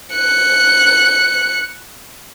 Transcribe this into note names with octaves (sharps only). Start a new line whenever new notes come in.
F#6 C#7